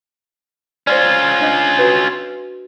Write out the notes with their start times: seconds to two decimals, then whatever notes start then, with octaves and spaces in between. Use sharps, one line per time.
0.87 C#4 F4 C5 D5
1.41 D4 D#5
1.79 F#4 B4